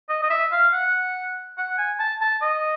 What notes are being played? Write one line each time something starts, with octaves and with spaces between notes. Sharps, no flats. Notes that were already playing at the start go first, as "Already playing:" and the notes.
D#5
D#5
E5
F5
F#5
F#5
G#5
A5
A5
D#5